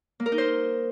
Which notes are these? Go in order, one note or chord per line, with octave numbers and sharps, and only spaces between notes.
A#3
A#4
D#4
C5